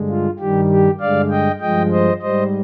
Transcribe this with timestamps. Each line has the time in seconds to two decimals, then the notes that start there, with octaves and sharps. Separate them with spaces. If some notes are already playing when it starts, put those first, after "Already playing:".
Already playing: G2 D3 G#3
0.09 F4
0.39 G2 D#3 G3 G4
0.70 G4
1.00 G2 D3 G#3 D5 F5
1.31 D#5 G5
1.61 G2 F3 G#3 D#5 G5
1.92 C5 D#5
2.22 G#2 G3 C5 D#5